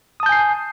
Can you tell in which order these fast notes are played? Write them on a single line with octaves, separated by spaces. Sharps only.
D#6 A5 G6 G#5 C7